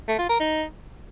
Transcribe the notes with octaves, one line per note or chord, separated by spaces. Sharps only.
A3
F4
A#4
D#4